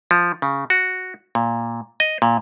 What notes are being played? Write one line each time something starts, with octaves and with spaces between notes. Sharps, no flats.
F3
C#3
F#4
A#2
D#5
A#2